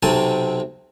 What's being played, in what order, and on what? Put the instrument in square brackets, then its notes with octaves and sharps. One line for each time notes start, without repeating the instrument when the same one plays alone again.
[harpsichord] B1 C3 C4 G#5 A5